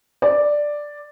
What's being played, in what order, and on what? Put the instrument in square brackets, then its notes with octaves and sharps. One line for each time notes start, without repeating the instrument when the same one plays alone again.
[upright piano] D5